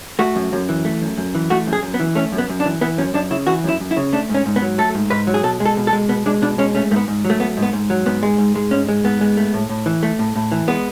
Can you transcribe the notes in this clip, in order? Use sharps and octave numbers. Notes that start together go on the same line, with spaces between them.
A3 F#4
F#2
F#2
E3
A3
F#2
F#2
E3
A3 F#4
F#2
G#4
F#2
B3
E3
A3 C#4
F#2
B3
F#2
D4
E3
E3 B3
F#2 C#4
F#2 D4
C#3 E4
E3 F#4
F#2 E4
F#2
E4
C#3
A3 D4
G#2
C#4
G#2
B3
F#3
A3 A4
G#2
G#2 B4
F#3
G#4
B2 A4
G#3
A4
B2
A4
G#3
B2 B3
G#3 D4
B2 D4
G#3 C#4
A3 C#4
G#2 A3
B3
G#2
F#3
A3
A3 B3
G#2
B3
G#2
F#3
G#2 B3
G#3
G#2
G#3
G#2 C#4
G#3
G#2 B3
G#3
A3
A2
A2
E3
A3
A2
A2
E3
G#3 B3